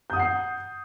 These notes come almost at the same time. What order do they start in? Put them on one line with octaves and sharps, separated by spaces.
G6 D#6 F#5 C7